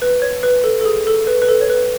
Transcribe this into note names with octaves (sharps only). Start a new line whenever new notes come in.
B4
C#5
B4
A4
A4
G#4
A4
B4
B4
A4
C#5
B4